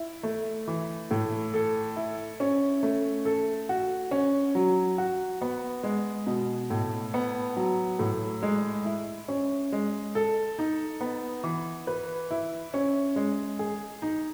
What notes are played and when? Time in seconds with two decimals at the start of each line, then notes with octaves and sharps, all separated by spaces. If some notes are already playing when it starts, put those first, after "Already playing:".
Already playing: E4
0.23 A3
0.67 E3
1.11 A2
1.54 A4
1.96 E4
2.40 C#4
2.83 A3
3.25 A4
3.69 F#4
4.11 C#4
4.55 F#3
4.98 F#4
5.41 B3
5.83 G#3
6.27 B2
6.70 A2
7.14 B3
7.56 F#3
7.99 A2
8.42 G#3
8.85 E4
9.28 C#4
9.72 G#3
10.15 A4
10.59 D#4
11.01 B3
11.44 E3
11.87 B4
12.31 E4
12.74 C#4
13.16 G#3
13.59 G#4
14.02 D#4